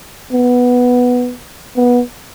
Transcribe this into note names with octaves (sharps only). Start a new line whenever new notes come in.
B3
B3